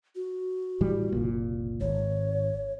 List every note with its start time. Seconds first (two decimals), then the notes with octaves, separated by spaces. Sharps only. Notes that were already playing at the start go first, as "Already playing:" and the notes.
0.15 F#4
0.81 A2 E3 G3
1.12 F#1 C2 A#2
1.81 G#1 C#5